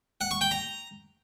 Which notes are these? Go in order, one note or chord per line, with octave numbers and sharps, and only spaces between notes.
F#5
C#6
G5
A#5